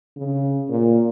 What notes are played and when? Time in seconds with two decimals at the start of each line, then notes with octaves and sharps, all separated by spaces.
0.17 C#3
0.69 A#2